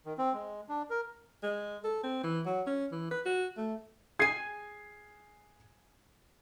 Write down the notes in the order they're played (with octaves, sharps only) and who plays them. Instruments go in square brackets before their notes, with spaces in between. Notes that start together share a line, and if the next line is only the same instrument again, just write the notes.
[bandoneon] D#3
C4
G#3
D4
A#4
[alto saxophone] G#3
A4
C4
E3
F#3
C#4
E3
B4
F#4
A3
[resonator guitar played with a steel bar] G#4 G#5 [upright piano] G#6 C7